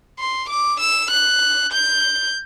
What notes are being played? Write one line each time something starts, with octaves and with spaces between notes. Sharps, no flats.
C6
D6
E6
F#6
G6